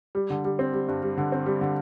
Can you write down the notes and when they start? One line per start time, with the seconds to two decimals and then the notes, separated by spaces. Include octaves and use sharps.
0.15 G3
0.30 D3
0.45 G3
0.59 C4
0.73 G3
0.88 G2
1.03 G3
1.17 D3
1.32 C4
1.46 G3
1.61 D3